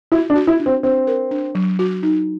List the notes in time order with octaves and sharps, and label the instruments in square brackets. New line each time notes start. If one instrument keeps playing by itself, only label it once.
[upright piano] E4 [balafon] F#4
[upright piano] D4
[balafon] F#4
[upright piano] E4
[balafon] D4
[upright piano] C4
[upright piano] C4 [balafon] D4
[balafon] A#4
D4
F#3
F#4
D#4